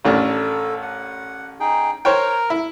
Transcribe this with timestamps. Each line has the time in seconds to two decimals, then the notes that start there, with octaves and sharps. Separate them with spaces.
0.05 A1 D#3 D4 A4
0.82 F#5
1.60 D#4 G#4 G5
2.05 A#4 C5 C#5 G5 A#5
2.50 E4